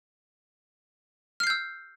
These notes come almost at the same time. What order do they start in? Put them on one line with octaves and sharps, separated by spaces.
F6 C7 G6 E6